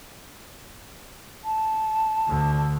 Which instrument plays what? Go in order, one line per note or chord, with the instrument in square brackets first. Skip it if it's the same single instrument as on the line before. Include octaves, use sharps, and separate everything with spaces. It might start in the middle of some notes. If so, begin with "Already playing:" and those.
[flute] A5
[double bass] D2 D3